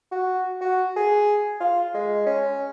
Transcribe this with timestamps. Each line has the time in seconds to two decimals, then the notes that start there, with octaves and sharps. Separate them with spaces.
0.12 F#4
0.61 F#4
0.97 G#4
1.60 F4
1.94 G#3
2.27 C#4